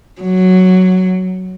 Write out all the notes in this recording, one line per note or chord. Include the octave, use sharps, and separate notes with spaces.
F#3